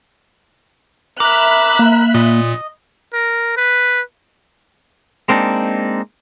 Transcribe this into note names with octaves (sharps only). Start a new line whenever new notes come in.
A#4 E5 B5 D6 F#6
A#3
A#2 D#5
A#4
B4
G#3 A#3 C4 D4 D#4